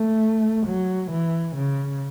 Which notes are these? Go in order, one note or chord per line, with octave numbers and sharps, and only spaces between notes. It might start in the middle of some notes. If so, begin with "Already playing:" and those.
Already playing: A3
F#3
E3
C#3